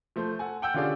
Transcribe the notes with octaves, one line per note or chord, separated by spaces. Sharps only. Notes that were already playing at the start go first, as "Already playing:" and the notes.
F3 A3 C5
A4 F#5 G#5
F#5 G5 E6 G6
D3 C#4 F4 G4 G#4 D5